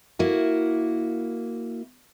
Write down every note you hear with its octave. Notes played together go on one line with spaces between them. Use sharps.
A#3 E4 F#4